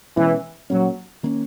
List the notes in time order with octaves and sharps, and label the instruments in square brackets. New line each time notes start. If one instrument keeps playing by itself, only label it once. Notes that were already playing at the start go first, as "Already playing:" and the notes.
[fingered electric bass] B2 G#3 C#4 [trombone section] E3
[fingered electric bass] A#2 A#3 C#4 [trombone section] F#3
[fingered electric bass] D#3 A#3 C#4